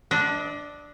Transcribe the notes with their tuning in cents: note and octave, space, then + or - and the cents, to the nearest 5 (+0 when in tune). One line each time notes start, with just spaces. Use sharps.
D4 +0 D#5 +40